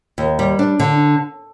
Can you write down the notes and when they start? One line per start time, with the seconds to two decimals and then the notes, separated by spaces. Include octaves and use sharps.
0.18 D#2
0.39 G3
0.59 D4
0.80 D3